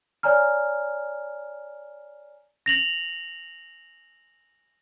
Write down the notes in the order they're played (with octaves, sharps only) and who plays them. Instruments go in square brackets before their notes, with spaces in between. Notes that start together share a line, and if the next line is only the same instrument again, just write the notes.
[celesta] C#5 D5 G#5 A#5 F6
[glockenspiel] A#6 F7 F#7